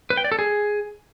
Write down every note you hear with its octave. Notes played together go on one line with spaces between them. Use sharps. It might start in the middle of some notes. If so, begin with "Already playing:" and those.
B4
G5
D5
A4
G#4